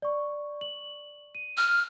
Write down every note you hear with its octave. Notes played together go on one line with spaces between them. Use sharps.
D5 C#6
F#7
D#7
F6